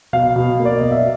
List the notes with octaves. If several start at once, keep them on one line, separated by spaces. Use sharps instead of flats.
B2 F5
B2
A#3
D5
B2 D#5
E5